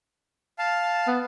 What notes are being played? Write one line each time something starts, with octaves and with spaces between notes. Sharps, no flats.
F5 A5
B3